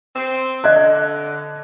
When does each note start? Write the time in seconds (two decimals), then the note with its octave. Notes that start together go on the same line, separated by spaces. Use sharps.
0.14 C4
0.64 D3 D#5 F#6 G#6